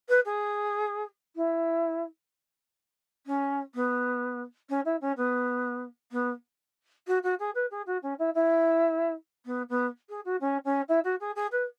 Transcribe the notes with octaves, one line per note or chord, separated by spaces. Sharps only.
B4
G#4
E4
C#4
B3
C#4
E4
C#4
B3
B3
F#4
F#4
G#4
B4
G#4
F#4
C#4
E4
E4
B3
B3
G#4
F#4
C#4
C#4
E4
F#4
G#4
G#4
B4